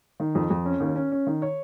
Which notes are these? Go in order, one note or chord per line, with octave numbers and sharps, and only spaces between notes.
D#3
F2
F2
C#4
D#2
C#4
C#4
D#3
C#5